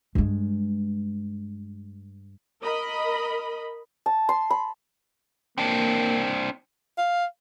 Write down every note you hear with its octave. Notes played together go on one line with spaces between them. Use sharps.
G2 G#3
A#4 D#5 B5
A5
C6
B5
A#3 C4 D4
F5